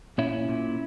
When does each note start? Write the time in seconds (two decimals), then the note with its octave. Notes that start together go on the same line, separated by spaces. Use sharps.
0.18 A#2 C#4 E4
0.49 A#2